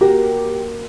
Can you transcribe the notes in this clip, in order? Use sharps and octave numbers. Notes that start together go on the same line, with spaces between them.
A#3 F#4 G4 A#4